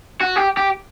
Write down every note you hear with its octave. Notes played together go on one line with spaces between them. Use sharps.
F#4
G4
G4